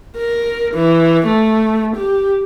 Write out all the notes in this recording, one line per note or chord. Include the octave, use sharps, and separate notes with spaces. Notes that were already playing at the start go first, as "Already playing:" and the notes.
A#4
E3
A3
G4